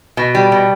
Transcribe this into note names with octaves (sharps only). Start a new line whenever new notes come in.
B2
G3
B2